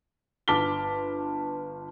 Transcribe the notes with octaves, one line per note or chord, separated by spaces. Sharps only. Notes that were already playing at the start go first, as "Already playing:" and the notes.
G1 A5 D6 F6 B6 G7